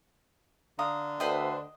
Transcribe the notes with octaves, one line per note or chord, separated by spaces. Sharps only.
D3 F5 A#5 D#6
D2 B4 C5 D#5 G5